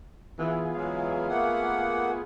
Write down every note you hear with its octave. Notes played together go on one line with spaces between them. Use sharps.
E3 B3 F4 G#4
E3 F#3 G#3 F5
A3 A#3 F#5